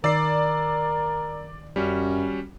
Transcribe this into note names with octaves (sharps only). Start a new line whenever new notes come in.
D#3 A#4 D5 E6 C7
F#2 G3 C#4 F#4